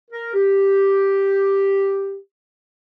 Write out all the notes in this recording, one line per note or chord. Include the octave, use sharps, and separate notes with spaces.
A#4
G4